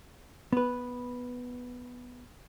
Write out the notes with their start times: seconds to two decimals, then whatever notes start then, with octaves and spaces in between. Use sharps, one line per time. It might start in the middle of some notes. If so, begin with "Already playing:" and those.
0.53 B3 B4